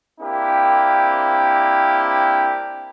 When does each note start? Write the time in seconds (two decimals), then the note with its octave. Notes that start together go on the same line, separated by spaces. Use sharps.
0.21 A#3 C4 D4 E4 G4